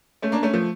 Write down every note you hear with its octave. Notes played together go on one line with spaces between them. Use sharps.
A3 C#4
A#3 D4
A3 C#4
F3 A3